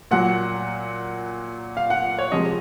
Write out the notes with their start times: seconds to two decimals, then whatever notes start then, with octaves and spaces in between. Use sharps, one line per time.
0.11 A#2 F#3 F#5
1.77 F5
1.90 F#5
2.19 C#5
2.32 C3 F3 G#3 D#5